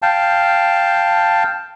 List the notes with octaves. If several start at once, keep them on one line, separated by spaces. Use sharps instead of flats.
F5 G5 A5